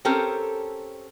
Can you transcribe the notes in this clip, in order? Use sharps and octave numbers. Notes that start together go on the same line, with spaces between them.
C4 C#4 G4 A4 A#4